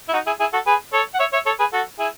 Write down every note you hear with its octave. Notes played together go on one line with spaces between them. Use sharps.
E4
D#4 F#4
E4 G#4
E4 G#4
F#4 A4
G#4 B4
A4 C#5
F#5
C#5 E5
C#5 E5
A4 C#5
G#4 B4
F#4 A4
E4 G#4